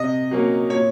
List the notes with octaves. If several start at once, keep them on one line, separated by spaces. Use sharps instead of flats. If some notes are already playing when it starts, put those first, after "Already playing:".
Already playing: C3 D#5
F#3 A#3 C#4
A#2 C#5